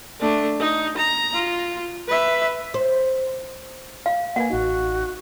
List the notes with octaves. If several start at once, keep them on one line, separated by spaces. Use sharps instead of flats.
A3 D4
D#4
A#5
F4
B4 E5
C5
F5
A#3 B4 F#5 G#5
A1 D#4 F#4